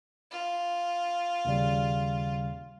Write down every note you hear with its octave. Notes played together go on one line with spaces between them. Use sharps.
F4
D#2 C#3 G3